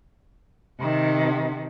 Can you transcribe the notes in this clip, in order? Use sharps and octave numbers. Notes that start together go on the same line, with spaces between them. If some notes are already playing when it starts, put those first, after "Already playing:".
C3 D#3